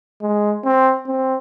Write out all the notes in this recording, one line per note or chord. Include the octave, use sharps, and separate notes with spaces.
G#3
C4
C4